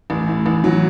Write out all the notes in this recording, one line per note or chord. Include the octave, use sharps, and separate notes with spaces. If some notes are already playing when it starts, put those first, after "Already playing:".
A1
A2
A1
F#3